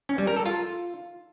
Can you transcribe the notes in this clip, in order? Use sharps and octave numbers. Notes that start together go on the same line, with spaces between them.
C#4
G3
A#4
A4
F4